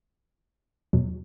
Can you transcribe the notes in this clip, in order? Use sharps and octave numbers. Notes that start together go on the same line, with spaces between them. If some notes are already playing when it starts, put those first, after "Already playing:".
E2 B2 F#3